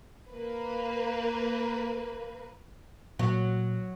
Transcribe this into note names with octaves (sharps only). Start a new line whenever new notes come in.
A#3 B4
A#2 F#3